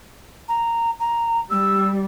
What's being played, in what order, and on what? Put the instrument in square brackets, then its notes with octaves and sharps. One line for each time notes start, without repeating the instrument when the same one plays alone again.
[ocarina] A#5
A#5
[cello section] G3 [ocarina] E6